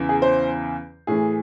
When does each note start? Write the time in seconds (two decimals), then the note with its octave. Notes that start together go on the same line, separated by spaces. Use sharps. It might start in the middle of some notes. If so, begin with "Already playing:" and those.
Already playing: E2 C#3 E3
0.09 G#4
0.22 C5
1.07 A2 E3 G#4